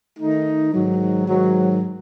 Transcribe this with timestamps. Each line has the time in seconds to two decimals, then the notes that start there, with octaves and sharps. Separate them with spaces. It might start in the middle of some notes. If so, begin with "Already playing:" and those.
0.19 D#3 A3 D#4
0.73 G#2 D#3 F#3
1.28 G#2 D#3 F#3